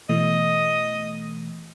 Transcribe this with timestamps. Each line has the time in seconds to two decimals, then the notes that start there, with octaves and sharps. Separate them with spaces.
0.09 B2 E3 A3 D#5